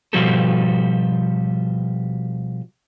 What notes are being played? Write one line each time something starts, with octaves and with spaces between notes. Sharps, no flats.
B2 F3 G3 F#4 G4 A4